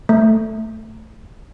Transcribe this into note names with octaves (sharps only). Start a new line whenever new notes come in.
A3